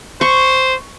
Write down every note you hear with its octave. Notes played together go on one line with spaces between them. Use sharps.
C5 C#6